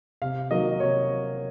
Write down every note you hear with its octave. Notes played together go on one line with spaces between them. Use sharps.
C3 F5
D#3 F#3 A#3 D#5
C3 C#5